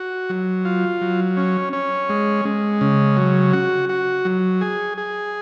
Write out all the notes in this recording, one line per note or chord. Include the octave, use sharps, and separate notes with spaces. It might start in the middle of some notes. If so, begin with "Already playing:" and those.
Already playing: F#4
F#3
F4
F#3
C#4
C#4
G#3
G#3
C#3
F#3
F#4
F#4
F#3
G#4
G#4